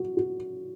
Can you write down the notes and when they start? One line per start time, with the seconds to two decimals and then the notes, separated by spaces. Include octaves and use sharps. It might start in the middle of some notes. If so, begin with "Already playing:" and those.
Already playing: F#3 F#4
0.17 F#4